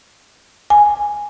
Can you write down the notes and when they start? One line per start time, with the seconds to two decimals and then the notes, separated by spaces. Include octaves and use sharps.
0.70 G#5